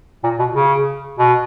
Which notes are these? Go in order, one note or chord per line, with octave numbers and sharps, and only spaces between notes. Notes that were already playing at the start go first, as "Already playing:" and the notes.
A#2
B2
C#3
B2